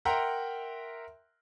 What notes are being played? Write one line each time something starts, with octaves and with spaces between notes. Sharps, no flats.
A#4 E5 F#5 G5 A#5 C6